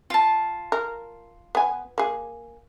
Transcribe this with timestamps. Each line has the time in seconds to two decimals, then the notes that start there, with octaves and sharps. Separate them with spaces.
0.10 F4 A5
0.72 A#4
1.55 B3 G#5
1.98 A#3 G#4